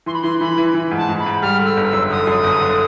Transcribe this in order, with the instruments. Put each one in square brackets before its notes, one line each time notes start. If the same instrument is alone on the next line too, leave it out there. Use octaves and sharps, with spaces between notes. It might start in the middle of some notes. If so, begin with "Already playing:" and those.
[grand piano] E3 [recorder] C6
[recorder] B5
[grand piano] E3 [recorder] C6
[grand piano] E3 [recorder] B5
[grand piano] E3
E3
G#2
[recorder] A5
[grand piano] G#2
[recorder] B5
[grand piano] G#2
[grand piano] G3 [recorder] F6
[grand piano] D3
[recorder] E6
[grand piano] G1
[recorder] E6
[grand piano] F#2
[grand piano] D3 [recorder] D#6
[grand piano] F#2
G1
D3